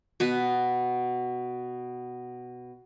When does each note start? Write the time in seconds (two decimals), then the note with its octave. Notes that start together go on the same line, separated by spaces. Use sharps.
0.20 B2 B3 B4